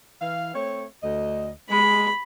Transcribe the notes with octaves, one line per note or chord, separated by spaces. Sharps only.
E3 F5
A3 C4 C#5
D2 D#5
G#3 B5